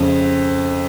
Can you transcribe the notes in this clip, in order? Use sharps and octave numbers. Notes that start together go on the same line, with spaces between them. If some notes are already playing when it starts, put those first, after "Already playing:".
Already playing: F2 C#3